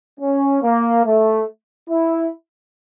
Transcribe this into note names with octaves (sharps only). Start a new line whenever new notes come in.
C#4
A#3
A3
E4